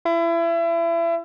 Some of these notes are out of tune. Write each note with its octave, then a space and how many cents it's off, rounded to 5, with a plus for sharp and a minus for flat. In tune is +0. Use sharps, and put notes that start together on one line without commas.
E4 +30